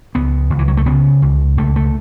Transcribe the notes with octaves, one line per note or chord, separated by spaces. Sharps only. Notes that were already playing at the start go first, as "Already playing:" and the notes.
C#2 B3
C#2
E3
F#3
A3
C#3 B3
C#2
C#2 A3
A3